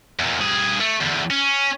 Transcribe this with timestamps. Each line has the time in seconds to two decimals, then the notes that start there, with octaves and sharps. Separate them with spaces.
0.19 E2 A#2
0.41 G2 G#4
0.81 A3
1.01 E2 D3
1.30 C#4